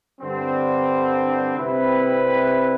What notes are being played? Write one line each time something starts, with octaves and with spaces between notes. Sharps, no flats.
G2 D3 G3 C4
C3 G3 C4 E4 B4